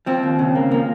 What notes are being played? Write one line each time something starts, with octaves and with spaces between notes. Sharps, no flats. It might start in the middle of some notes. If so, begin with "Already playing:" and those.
F3 C4
D#2
C#3
A#3
F3 A#3